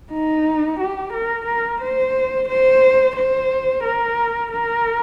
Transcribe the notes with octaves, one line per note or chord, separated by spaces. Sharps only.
D#4
G4
A#4
A#4
C5
C5
C5
A#4
A#4